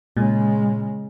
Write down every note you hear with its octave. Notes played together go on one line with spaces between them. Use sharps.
A#2 C#3 G#3